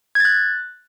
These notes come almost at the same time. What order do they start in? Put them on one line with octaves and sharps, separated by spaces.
G#6 A6 F#6